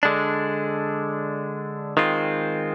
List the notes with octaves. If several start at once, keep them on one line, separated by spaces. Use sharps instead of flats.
D3 G#3 D4
D#3 G#3 C4 F4